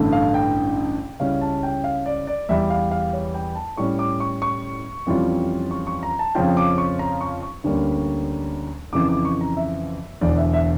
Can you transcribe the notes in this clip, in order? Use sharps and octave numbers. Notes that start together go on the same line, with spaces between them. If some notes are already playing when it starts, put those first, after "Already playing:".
Already playing: A1 G2 D3 A3
F5
G5
C#2 C#3 G3 C#4 E4 F5
A5
G5
F5
D5
D5
E2 E3 G3 E5
F5
F5
C#5
G5
A5
A2 G3 C#4 C#6
D6
C#6
C#6
F2 E3 G3 C#4 F4
C#6
C#6
A#5
A5
F2 C#3 F3 C#4 F4 G5
D6
C#6
A#5
C#6
C#6
D2 D3 G3 A#3 C#4
F2 C#3 E3 D6
D6
C#6
A#5
E5
E1 E2 D3 D5
E5
E5